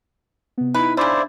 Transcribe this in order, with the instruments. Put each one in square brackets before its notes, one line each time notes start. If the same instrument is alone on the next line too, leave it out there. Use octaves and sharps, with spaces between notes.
[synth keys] C3 B3
[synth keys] D#4 E4 [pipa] B4
[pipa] C#3 E4 [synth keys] D4 [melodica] C5 D5